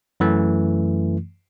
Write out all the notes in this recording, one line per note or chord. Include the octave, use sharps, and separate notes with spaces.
F#2 E3 A3